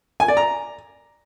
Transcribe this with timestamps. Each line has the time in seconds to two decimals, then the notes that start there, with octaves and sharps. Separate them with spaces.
0.20 G#5
0.28 D5
0.37 A#5